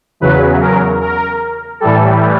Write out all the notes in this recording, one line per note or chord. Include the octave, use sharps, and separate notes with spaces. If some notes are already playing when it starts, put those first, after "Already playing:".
E2 C#3 F#3 B4
A#4
A#4
A2 E3 G3 A4